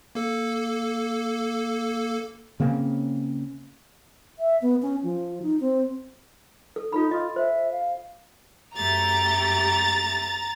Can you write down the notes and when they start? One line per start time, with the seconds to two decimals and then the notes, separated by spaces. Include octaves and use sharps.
0.15 A#3 A4
2.60 C#3 A#3 C4 C#4
4.39 E5
4.62 B3
4.82 C#4
5.03 F3
5.42 D#4
5.60 C4
6.76 A4
6.92 D#4 F4 A4 B5
7.11 F4 D#5
7.36 C5 E5
7.71 F5
8.76 F#2 A3 G4 A#5 A6